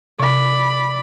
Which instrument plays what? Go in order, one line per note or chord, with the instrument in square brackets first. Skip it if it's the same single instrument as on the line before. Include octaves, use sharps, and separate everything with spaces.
[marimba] C3 [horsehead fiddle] D5 B5